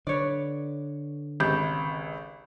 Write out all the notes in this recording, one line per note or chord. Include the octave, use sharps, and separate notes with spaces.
D3 B4 C#5 D5
G#1 C#2 G4 B5 G6